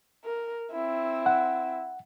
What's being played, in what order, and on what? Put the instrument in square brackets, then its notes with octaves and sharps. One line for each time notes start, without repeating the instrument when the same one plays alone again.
[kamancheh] A#4
C4 E4
[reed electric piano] F#5